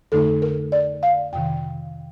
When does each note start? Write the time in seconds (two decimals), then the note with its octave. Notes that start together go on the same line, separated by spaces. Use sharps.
0.12 F2 D3 A3 D#4 A4
0.42 A#4
0.72 D5
1.03 F5
1.33 F2 C3 D#3 G5